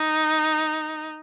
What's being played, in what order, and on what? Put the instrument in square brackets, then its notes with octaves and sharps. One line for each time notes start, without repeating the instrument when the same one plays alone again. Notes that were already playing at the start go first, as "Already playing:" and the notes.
Already playing: [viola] D#4